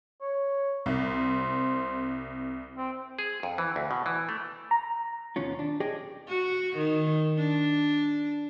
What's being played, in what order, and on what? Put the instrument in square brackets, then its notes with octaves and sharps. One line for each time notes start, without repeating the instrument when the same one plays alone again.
[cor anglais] C#5
[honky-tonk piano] C2
[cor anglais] C5
C4
[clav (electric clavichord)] G#4
F2
E3
D2
B2
E3
A3
[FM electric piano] A#5
[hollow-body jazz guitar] D#2 B2 C#4 F4
D4
G4 G#4 C#5 D#5 G5
[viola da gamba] F#4
D#3
D4